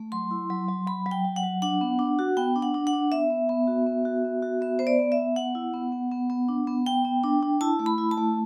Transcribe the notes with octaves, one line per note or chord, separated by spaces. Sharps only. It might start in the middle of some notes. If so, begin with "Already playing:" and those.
Already playing: A3
F#3 C6
E4
F#3
F#3
F#3 B5
F#3
G5
F#3
F#5
F#3
D4 F#5
B3
D4
F#4
B3 G5
D4
F#5
D4
F#5
D4
B3 E5
B3
B3
F#4
B3
F#4
B3
F#4
B3 E5
B3 C5
D5
B3
E5
B3
B3 F#5
E4
B3
B3
B3
B3
D4
B3
B3 G5
B3
D4
D4
E4 A5
A3
B5
E4
A5
A3